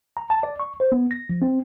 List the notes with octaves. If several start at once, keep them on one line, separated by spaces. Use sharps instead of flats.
A#5
A5
D5
C#6
C5
B3
A#6
F3
C4